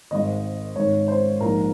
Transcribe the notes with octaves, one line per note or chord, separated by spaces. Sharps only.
G#1 G#2 D#3 D#5
G#1 G#2 D#3 C#5
C5
A#1 G#2 F3 A#4